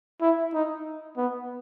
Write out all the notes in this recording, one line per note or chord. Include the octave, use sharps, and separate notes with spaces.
E4
D#4
B3